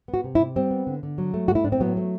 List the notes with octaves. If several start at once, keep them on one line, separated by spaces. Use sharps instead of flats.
B3
F#4
C3
E4
C3
G3 C4
B3
D3
D3
F#3
A3
A2 F#4
E4
A2 D4
C4
F#3 B3
A3